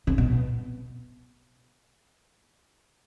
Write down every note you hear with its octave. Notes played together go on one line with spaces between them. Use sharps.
C3
B2